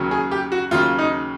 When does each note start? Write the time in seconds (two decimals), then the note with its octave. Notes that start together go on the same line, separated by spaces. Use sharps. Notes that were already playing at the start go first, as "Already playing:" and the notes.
Already playing: D#2 C#3 F#3
0.11 G#4
0.31 G4
0.52 F#4
0.71 D#2 C#3 F#3 F4
0.99 D#4